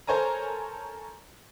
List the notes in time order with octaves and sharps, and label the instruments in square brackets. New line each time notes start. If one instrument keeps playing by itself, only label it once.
[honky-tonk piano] A4 A#4 C5 C#5 G#5 A#5